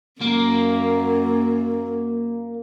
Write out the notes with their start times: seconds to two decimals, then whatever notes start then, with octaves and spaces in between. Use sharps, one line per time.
0.22 F#2 A#3